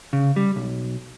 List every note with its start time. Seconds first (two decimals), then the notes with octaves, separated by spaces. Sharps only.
0.13 C#3
0.36 G3
0.56 B1